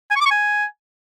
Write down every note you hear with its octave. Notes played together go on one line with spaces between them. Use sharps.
G#5
C#6
D6
C#6
G#5